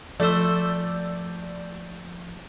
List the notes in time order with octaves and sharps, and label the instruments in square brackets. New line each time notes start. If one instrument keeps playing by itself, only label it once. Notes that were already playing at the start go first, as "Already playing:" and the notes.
[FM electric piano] F3 G6 A6 [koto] A3 C5 [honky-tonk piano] D5 E6